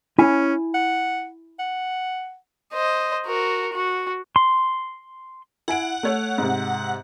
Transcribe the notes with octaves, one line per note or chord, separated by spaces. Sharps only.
C#4 E4 G#5
F#5
F#5
C5 D#5
F#4 A#4
F#4
C6
E4 F#5 G#5 D7
A3 C#5
G#2 C3